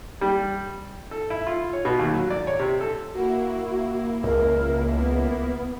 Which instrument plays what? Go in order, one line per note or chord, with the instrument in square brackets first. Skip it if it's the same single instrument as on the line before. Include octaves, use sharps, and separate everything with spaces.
[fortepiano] G3
A4
E4
F4
C#5
B2
D#2
F#3
D5
C#5
C3
A4
[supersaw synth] A#3 E4 [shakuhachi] F#4
[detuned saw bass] C#2 [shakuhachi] A#4
[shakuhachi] B3